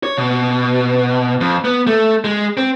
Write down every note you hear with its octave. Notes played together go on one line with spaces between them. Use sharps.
C#5
B2
F2
B3
A3
G#3
C4